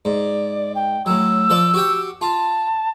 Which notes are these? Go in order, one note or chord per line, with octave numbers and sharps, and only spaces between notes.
G#2 D5
G5
A2 F#3 E6
F3 A4 D5
F#4 G4 G5
F4 A5